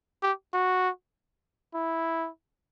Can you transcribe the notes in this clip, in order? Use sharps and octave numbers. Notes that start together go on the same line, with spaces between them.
G4
F#4
E4